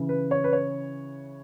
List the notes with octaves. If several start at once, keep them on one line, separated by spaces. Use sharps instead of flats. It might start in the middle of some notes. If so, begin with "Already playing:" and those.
Already playing: C#3 E3
B4
C#5
B4
C#5